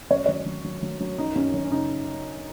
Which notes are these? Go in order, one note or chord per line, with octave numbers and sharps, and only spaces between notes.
F#2 C#5
F#3 C#5
F#3
F#3
F#3
F#3
F#2 D#4
F#2 C#4
F#2 C#4
C#4
C#3 D#4